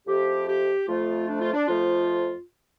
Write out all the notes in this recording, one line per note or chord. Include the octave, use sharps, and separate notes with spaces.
F2 F3 A3 G4
G4
F2 F3 A3 F4
D4
F4
D4
F2 F3 A3 F4